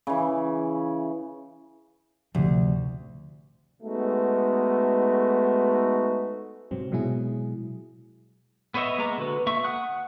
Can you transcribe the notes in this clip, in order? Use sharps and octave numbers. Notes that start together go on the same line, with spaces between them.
C#3 E3
A1 D2 C3 F3
G#3 A3 B3 D#4 F#4
G#2 C3 F#3 C4
B2 F#3 G#3 E4 G#4
B3 B4 C#5 D#5 E5
G#3 A#3 B3 A#5 D6
D3 F#4 B4
A#3 E5 C#6
F#5 D#6 F#6